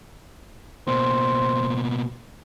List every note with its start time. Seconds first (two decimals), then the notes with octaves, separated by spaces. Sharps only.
0.88 B2 A#3 C5